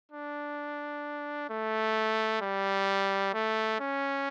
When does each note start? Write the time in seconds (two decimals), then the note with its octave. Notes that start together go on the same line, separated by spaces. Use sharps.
0.12 D4
1.50 A3
2.42 G3
3.34 A3
3.80 C#4